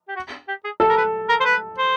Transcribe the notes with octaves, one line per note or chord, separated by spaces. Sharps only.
G4
F#4
G4
G#4
A4
A#4
B4
A#4
C5
B4
C5